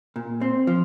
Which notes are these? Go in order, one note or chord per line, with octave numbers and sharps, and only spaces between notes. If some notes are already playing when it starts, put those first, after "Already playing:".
A#2
C4
F3